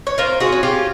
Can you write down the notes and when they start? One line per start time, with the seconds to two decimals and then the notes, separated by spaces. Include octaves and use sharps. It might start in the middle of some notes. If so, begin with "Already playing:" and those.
0.07 C#5
0.18 F4 A#4 C5
0.40 F#4 G#4
0.52 C#4
0.63 F4 G4